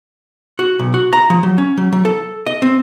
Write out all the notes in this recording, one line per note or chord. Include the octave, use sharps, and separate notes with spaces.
F#4
B1
F#4
A#5
F3
F#3
C#4
F#3
F#3
A4
D#5
C4